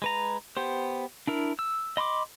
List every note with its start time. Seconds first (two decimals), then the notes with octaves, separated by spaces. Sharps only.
0.02 G#3 B4 A#5
0.57 B3 G4 C5
1.27 D4 E4 A#4
1.59 E6
1.97 D#5 B5 C6 D6